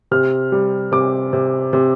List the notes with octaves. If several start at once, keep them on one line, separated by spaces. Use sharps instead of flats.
C3 F6
G3
C3 D6
C3
C3